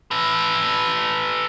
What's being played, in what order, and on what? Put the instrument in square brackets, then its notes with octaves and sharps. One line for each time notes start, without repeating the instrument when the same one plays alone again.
[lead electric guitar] A4 B4